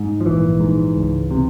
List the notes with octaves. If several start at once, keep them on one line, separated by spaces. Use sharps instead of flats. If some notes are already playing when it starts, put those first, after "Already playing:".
Already playing: G#2
F3
A#1 E3
G#2
C#2
C3